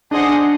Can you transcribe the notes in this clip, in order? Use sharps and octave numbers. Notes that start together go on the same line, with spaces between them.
D4 G#4 C5 D#5 F#5